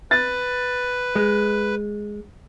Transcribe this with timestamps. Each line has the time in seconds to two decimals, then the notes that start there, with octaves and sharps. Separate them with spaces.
0.11 B4 A6
1.15 G#3